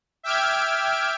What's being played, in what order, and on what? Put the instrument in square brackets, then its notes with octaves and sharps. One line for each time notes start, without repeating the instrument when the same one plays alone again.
[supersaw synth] E5 G5 D6 F6 G#6 D7